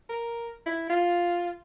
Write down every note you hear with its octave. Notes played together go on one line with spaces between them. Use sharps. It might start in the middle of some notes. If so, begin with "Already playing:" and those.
A#4
E4
F4